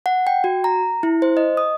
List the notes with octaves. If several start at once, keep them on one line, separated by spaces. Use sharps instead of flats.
F#5
G5
F#4
A#5
E4
C5
D#5
D#6